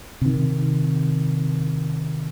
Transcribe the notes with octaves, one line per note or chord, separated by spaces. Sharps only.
C3 D#3